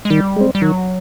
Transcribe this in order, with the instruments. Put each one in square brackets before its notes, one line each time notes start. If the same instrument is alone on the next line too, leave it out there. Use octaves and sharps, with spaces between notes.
[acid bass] G#3
[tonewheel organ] D#3 [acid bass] G3
[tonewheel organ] G#3 C4
[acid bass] G3
[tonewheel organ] D#3 [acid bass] F#3